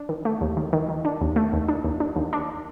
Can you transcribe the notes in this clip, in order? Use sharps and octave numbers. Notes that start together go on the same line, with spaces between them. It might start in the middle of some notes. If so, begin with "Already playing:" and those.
Already playing: D4
D#3
A3
D#2
D#3
D#3
D#3
D4
D#2
A3
D#2
D4
D#2
D4
D#2
D4